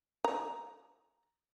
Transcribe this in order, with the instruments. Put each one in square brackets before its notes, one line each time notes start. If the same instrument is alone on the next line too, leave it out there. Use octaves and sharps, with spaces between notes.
[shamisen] A#5